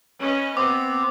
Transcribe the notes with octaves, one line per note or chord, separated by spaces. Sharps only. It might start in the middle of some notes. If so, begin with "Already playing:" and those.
C#4 B4 D#5
B3 C4 D6